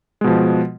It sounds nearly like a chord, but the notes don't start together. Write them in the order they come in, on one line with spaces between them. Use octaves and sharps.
G#3 B2 F3